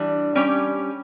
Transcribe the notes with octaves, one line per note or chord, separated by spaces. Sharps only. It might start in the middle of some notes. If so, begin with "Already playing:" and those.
Already playing: E3 G3 D4
G3 C#4 G4 C#5